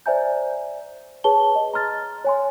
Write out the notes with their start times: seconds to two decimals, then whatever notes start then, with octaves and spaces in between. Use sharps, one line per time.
0.06 C5 D5 E5 G#5 A#5 G6
1.24 G#4 B4 C#5 A5 G7
1.55 D#5
1.74 A#5 C6 F6 A6
2.24 C#5 G#5 C6